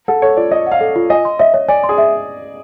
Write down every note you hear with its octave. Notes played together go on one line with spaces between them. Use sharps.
A4 F#5
A4 C#5
F4 D5
C#5 D#5
F#5
F5
A4
F4
D#5 G#5
C6
D#5 E5
C#5
D5 G#5
C6
G#4
E5